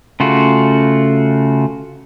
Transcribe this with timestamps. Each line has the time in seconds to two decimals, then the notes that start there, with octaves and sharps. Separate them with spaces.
0.20 C#3 A3 F4 F#4